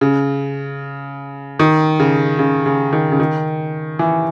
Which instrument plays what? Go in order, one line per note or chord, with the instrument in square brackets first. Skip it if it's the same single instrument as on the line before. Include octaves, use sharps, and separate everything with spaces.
[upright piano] C#3
D#3
C#3
C#3
C#3
D#3
C#3
D#3
E3